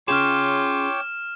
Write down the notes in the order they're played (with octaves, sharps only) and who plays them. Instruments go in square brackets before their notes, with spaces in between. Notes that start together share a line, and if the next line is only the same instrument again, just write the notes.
[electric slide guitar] C#4 G#4 [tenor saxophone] F4 [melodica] C#5 G5 D6 [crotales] F6 E7